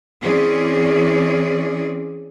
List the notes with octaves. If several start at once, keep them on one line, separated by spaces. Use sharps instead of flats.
E3 C4 C#4 G#4 D5